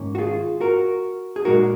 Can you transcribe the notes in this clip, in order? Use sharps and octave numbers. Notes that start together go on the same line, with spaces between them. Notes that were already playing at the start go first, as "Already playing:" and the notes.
Already playing: G#2 D#3 A#3 C#4
F#4
F4 G#4
F#4 A#4
G#4
A#2 G#3 D#4 F#4 A#4